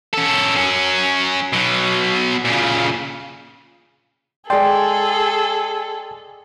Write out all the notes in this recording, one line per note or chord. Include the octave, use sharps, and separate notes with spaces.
C#4 A4
F#3 C#4
B2 F#3
A#2 C#3
G#3 G#4 A4 D5 G5 C6